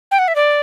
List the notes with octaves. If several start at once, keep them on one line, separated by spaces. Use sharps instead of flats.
G5
F#5
E5
D5